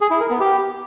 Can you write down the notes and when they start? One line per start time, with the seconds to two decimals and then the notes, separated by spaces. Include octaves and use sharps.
0.01 G#4
0.11 E4
0.20 A#4
0.30 B3
0.40 G4